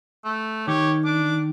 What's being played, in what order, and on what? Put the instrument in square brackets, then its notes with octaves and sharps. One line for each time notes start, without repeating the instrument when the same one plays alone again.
[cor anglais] A3
[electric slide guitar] D#3 [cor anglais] G4 [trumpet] C#5
[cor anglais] D4 [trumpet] D6